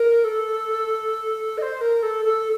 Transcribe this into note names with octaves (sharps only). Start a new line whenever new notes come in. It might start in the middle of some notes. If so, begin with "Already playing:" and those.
Already playing: A#4
A4
D#5
C5
A#4
A4
A4